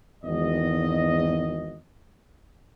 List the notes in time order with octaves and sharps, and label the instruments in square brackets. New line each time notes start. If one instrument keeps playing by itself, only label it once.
[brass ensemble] G#1 E2 D#5